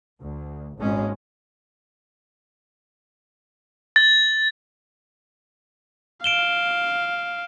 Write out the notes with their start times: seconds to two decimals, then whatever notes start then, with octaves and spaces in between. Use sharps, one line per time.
0.22 D2
0.77 G#1 A#2 G#3 C#4
3.96 A6
6.24 F5 D7 E7 G7